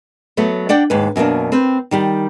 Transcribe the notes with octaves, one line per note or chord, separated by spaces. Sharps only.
F#3 A3 B3
D4 D5 F#5 G5
D#2 G#2 B4
F#2 B2 A3 A#3 D4
C4 B4 G5
D#3 G3 G4